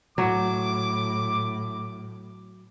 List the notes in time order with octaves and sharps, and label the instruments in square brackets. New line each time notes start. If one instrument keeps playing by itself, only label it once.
[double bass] A2 [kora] F#3 [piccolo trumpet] D6